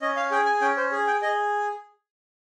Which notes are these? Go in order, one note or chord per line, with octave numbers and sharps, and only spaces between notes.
C#4 D#5
F5
G#4 G5
G#5
C#4 G5
C5
G#4
G5
G#4 D#5